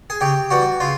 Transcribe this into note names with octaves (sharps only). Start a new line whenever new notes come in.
G#4
C#3 G4
E3 G3 F#4
C#3 F4